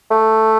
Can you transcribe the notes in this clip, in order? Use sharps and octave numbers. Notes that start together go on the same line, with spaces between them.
A3